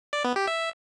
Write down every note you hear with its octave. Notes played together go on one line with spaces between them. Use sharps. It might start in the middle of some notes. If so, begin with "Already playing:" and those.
D5
B3
G4
E5